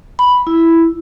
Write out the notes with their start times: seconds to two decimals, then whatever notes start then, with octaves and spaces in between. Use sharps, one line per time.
0.19 B5
0.47 E4